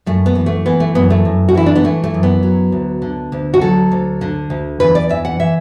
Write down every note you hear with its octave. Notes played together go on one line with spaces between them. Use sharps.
F#2 A3
B3
E3
A3
E3 B3
A3
F#2 B3
A3
F#2
F#4
E3 E4
D4
B3
E3 A3
A3
F#2
B3
F#3
D2
D3
D2
F#4
F#3 A4
D2
D3
D2
E2 B4
D5
E3 E5
F#5
E3 E5